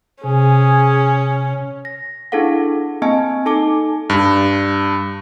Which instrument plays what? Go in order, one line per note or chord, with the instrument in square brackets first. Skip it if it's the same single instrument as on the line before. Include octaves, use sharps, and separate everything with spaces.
[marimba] C3 [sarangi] C#4 [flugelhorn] G#4
[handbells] A#6
D4 E4 G#4 A4 F5 F#5
A#3 C4 D#5 G#5 A5
D#4 A4 G#5 A5 D6
[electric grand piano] G2